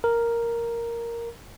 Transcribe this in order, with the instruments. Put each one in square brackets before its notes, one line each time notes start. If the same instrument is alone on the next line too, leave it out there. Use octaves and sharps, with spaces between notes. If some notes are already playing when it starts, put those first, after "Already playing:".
[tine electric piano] A#4